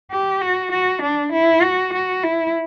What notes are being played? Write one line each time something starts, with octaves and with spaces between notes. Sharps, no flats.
G4
F#4
F#4
D4
E4
F#4
F#4
E4